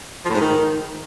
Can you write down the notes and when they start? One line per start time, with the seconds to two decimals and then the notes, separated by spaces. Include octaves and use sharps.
0.24 F3
0.29 A2
0.34 G#2
0.40 D#3